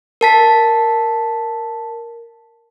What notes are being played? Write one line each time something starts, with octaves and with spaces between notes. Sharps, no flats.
A#4 A5 B6